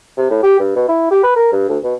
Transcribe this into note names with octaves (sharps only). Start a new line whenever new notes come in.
C3
A2
G4
G2
B2
E4
G4
B4
A#4
G2
D2
B2